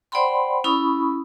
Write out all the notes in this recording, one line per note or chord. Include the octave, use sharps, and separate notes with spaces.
C5 D5 F#5 G5 B5 C6
C#4 E4 B5 C#6 D#6